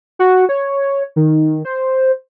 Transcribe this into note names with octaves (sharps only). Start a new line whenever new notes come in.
F#4
C#5
D#3
C5